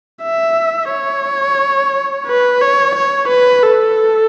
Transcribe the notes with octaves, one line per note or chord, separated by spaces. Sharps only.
E5
C#5
B4
C#5
C#5
B4
A4